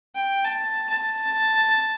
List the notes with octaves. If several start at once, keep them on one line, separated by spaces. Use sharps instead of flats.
G5
A5
A5